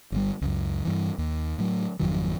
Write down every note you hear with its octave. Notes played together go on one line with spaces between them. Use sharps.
G1 G3
C#2 F#2
G2 E3
D#2
A2 F#3
G#1 F2 D#3 F#3